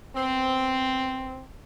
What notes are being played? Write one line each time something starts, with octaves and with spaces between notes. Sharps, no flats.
B3 C4